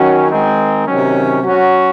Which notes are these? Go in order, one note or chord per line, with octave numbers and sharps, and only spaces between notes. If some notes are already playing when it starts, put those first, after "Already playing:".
Already playing: D#3 F#3 C#4 F#4
D#3 G#3 C4 D#4
C3 D#3 F#3 C#4
F#3 C#4 F#4